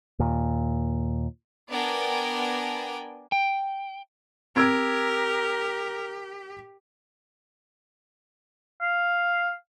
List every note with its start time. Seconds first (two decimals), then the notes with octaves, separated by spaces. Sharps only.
0.19 D#2 A#2
1.70 B3 D4 A#4 D5 G5 G#5
3.32 G5
4.56 C4 G4 A#4 E6 G#6 D7
8.81 F5